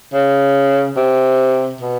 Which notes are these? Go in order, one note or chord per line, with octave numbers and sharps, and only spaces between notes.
C#3
C3
B2